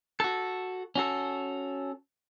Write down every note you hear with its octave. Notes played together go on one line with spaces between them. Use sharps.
F#4 A4
C#4 F#4 A4